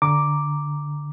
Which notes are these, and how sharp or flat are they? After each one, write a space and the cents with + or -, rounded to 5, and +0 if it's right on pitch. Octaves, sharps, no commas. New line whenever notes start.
D3 +0 A#5 +5 D6 +0